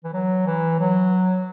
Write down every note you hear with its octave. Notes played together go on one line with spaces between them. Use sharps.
E3
F#3
E3
F#3